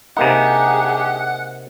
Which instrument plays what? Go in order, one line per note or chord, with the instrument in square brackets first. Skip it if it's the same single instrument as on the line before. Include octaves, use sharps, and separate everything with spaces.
[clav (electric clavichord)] C3 A#3 D#4 [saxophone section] D4 G4 [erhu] G#4 [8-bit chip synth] F#5